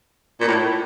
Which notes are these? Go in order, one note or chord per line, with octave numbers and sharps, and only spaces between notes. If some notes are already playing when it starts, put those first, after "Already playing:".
A#2
A2